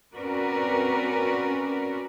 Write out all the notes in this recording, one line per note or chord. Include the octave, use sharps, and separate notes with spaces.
C4 C#4 F#4 A#4 B4 D5